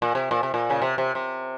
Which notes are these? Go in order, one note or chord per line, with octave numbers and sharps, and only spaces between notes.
A#2
C3
A#2
C3
A#2
C#3
C3
C3
C3